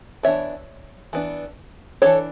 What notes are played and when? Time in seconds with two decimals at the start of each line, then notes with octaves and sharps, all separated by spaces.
0.23 E3 B3 D4 C#5 E5
1.13 E3 B3 D4
2.02 E3 A3 D4 A4 C#5